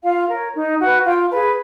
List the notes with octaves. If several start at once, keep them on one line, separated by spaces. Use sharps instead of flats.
F4 F5
A#4 C#5
D#4
F#4 F5
B4
F4 G5
G#4 B4 A5